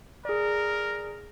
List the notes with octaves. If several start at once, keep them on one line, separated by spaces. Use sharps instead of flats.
G#4 A#4 D5